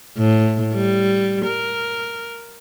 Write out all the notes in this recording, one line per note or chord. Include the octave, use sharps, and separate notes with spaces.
A2
G3
A#4